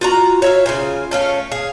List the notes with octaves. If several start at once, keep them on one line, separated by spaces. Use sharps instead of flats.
F4 F#4 A#5
C#5 E5 F5
C#3 F4 G#5
A3 C#4 F5
G#4 F5